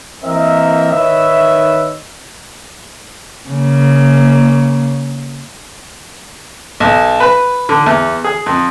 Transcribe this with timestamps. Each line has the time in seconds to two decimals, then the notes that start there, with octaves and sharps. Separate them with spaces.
0.23 E3 A#3 C4 A#4 D#5 E5
0.91 D#3 B4 C#5 D#5 E5
3.50 C#3 A#3
6.80 B1
7.20 B4
7.69 D3
7.86 E2
8.24 G#4
8.46 F2